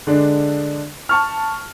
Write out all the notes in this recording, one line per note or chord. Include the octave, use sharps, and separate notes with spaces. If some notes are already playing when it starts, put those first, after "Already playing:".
D3 G#3 D4
A5 C#6 F6